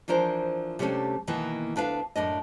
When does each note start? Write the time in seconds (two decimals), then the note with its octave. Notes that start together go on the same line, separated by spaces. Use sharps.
0.08 E3 F3 D4 A#4 C5
0.79 C3 G3 A3 C#4 D4
1.27 B2 D#3 E3 A#3
1.76 D2 D4 B4 F5
2.15 F#2 A2 D4 D#5